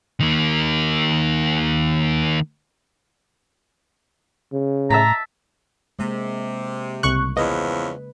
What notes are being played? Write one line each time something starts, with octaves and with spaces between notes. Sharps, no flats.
D#3 A#3
C#3
A2 E5 A5 A#5 B6
C3 G#3 A#3
C2 C#3 C#6 F#6
E2 F3 C#4 B4 D#5